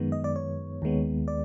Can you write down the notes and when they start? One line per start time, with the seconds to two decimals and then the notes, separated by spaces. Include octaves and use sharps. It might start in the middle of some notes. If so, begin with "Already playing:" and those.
Already playing: F#2 D#3 G#3 B3
0.12 D#5
0.24 D5
0.36 C#5
0.82 D#2 D#3 G#3 B3
1.28 D5